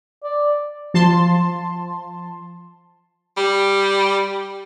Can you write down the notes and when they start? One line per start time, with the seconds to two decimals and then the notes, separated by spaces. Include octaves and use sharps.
0.23 D5
0.94 F3 A5 C6
3.37 G3